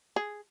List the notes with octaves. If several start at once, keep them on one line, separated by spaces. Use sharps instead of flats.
G#4